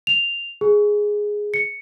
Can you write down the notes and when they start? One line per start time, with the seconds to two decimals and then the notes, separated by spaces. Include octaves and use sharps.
0.07 F7
0.61 G#4
1.54 C#7